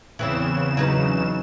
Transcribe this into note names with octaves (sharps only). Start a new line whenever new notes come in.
E2 C#3 E3 C4 C#4 E7
F#3 D#4 B4